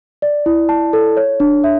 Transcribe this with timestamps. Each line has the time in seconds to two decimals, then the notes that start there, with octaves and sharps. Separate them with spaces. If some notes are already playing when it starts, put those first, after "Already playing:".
0.22 D5
0.46 E4
0.69 A5
0.93 A4
1.17 C#5
1.40 D4
1.64 E5